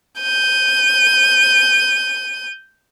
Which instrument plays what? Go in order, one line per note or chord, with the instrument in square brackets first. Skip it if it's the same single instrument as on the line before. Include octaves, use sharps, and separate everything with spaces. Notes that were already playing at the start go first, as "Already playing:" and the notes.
[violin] G6 D#7